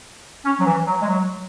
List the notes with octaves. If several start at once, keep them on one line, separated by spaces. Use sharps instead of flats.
C#4
F#3
E3
F#3
G#3
F#3